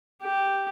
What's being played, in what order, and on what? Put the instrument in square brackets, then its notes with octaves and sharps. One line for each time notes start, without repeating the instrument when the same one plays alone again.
[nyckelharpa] G4